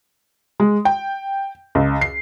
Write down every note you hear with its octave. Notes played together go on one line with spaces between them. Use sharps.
G#3
G5
C#2
C7